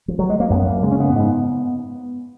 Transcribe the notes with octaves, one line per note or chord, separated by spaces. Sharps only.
F3
F#3
G#3
A#3
F#2 B3
F#2 A#3
C#3 G#3
C#4
C#3 B3
G#2